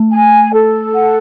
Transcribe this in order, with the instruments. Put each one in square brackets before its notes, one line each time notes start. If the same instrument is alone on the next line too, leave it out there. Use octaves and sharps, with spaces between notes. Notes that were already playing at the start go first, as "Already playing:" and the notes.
Already playing: [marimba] A3
[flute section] G#5
A4
F#5